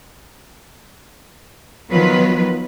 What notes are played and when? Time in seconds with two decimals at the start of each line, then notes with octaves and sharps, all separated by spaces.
1.90 D#3 F3 F#3 B3 F4 B4